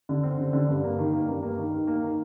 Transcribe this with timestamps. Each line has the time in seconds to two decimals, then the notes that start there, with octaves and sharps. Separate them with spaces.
0.09 D3
0.23 C4
0.39 D3
0.53 D3
0.69 G2
0.84 A#3
0.98 D#3
1.12 A#3
1.29 G2
1.42 A#3
1.58 D#3
1.72 D#3
1.87 A#3
2.03 D#3